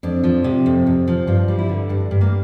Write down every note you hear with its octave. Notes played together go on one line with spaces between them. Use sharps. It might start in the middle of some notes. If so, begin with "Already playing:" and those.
F2 D4
F3
C3
F2
F2
F3
G2 F4
G3
E4
D3
G2 D4
G2
A#3